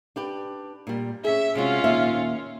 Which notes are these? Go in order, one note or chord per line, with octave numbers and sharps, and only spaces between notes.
D4 G4 B4
A#2 G3
C#4 G#4 E5
C3 G#3 C#4 F4 F#4
D#2 A#2 E5